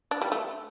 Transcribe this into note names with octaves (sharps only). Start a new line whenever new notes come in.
D4
G3
A3